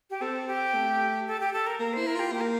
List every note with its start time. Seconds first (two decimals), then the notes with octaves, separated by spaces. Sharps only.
0.10 G4
0.21 C4 A4
0.48 G4
0.74 A3
1.27 A4
1.40 G4
1.54 A4
1.67 A#4
1.79 A#3 A#4
1.93 E4 C5
2.07 A#4
2.15 F4 G4
2.32 A#3 G4
2.41 A#4